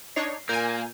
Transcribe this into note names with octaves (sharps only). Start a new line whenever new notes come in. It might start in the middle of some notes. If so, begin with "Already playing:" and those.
D4 D#4 C#5 C7
A#2 A#3 A#4 G#5 G6